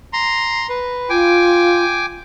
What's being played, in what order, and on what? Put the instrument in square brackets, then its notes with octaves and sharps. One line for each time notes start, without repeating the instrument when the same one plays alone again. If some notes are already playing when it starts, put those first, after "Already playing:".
[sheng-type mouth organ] A#5 C6
B4
[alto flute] F4 [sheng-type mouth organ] G5 G#5 D6